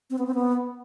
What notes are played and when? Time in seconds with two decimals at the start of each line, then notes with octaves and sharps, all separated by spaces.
0.10 C4
0.18 B3
0.26 C4
0.35 B3